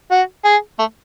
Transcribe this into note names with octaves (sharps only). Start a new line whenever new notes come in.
F#4
G#4
A3